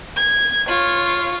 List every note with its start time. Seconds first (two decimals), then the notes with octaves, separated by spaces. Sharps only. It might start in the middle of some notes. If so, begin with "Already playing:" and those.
0.17 G#6
0.68 F4 C#5